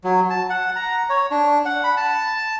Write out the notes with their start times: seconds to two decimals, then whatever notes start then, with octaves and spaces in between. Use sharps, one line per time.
0.04 F#3
0.30 A5
0.50 F#5
0.76 A#5
1.10 C#5
1.31 D4
1.65 F#5
1.84 B5
1.97 A5